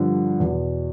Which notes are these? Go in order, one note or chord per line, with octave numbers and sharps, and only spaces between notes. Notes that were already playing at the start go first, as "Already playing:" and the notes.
Already playing: G2 D3 F3
E2 B2